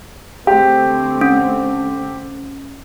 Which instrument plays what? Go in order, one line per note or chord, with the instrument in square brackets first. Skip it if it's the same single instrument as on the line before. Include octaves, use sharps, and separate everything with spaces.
[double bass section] D3 A3 C4 [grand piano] G4
[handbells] C#4